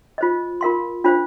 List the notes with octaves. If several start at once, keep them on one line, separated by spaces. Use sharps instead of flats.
F4 C5 D#5
F4 A#4 F5 C6
D4 F4 C5 F5